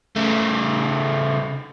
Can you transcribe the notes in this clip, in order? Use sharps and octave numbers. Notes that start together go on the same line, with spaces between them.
C#3 A3